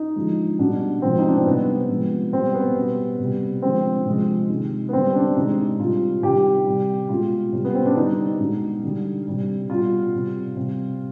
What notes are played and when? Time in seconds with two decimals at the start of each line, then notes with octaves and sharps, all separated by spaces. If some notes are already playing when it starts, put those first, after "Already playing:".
Already playing: D#4
0.16 D3 F3 G#3
0.59 B2 G3 D4
1.02 C3 F3 G#3 C4
1.18 D#4
1.28 D4
1.37 C4
1.45 C3 G3 B3
1.89 C3 F3 G#3
2.32 B2 G3 C4
2.54 B3
2.76 B2 G3
3.19 C3 G3
3.62 D3 F3 G#3 C4
4.06 C3 F3 G#3
4.49 C3 D#3 G#3
4.89 B3
4.93 D3 G3 C4
5.15 D4
5.36 C3 D#3 G#3 D#4
5.79 C3 G3 F4
6.22 C3 D#3 G3 G4
6.66 C3 G3
7.09 B2 G#3 F4
7.52 C3 G3
7.65 B3
7.75 C4
7.86 D4
7.97 D3 G3 D#4
8.40 B2 G#3
8.83 D3 G3
9.27 C3 G3
9.69 B2 G3 F4
10.14 C3 G3
10.56 C3 G3